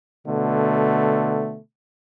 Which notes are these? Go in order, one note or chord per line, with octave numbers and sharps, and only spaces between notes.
B2 D3 A3